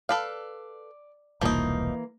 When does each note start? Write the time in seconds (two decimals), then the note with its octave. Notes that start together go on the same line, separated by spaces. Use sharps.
0.09 A4 B4 D5 F5
1.41 E1 C2 E3 F3 A#3 D#4